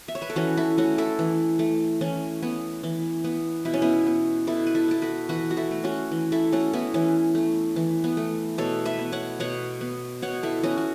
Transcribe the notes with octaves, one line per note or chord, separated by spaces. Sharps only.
E5
C#5
B4
A4
E3 C#4 F#4
E4 A4
A3 C#4 F#4
E4 A4
E3
A3
E3 C#4
B3
E3
B3
B2 E4
C#4
B3 E4
B3
B2 E4 A4
B4
E4 A4
B3 A4
F#4 B4
E3 F#4 B4
F#4
E4 A4
A3
C#4 F#4
E3
E4 A4
A3 C#4 F#4
B3 E4
E3 C#4
A3
E3
B3
A3
B2 A4 C#5
B4 E5
B3
C#5 F#5
B2 C#5 F#5
B3
B2 C#5 F#5
E4 A4
B3 C#4 F#4
F#4